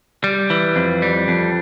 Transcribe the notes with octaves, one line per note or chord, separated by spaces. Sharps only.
G3
E3
F2
G3
F2